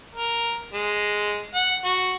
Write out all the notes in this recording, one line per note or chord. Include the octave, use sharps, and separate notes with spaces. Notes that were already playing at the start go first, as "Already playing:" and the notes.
A#4
G#3
F#5
F#4